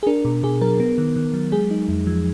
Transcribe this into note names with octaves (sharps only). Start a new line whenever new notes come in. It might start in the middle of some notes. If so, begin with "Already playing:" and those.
G#4
D4 A#4
B2
B2 G#4
F#3 A#4
B3
D#3
D#3
F#3
G#3 G#4
D#4
F2
F3